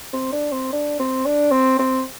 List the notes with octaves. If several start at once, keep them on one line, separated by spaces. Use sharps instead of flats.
C4
D4
C4
D4
C4
D4
C4
C4